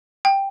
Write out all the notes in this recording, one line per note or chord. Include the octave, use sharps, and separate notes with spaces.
G5